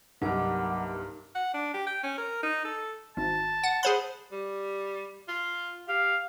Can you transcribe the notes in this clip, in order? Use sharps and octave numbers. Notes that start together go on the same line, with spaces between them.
C2 G2 F#3 A#3 D#4 D6
F#5
D4
G4
G5
C#4
A#4
D#4
A4
G#1 A5
F#5
G#4 C5 F#5 B5
G3
F4
G4 F5